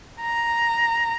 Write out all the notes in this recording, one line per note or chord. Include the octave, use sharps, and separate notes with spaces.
A#5